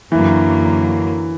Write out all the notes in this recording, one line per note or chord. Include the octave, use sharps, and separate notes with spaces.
F#2 D3 E3 F#3 A#3